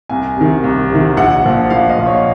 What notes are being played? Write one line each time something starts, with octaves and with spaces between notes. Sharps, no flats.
C2 G#5
C3 D#3
C2
C3 D#3
A#1 F#5
A#2 F3
A#1 F5
D#5
A#2 F3
C#5